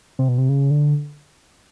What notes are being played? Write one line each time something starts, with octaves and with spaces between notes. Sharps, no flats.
C3
B2
C3
C#3
D3